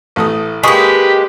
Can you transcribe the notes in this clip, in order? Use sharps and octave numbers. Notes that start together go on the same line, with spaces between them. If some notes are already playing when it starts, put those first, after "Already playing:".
A1 A3 D#6
G#3 A#3 G4 B4 G#5 C#6 D#6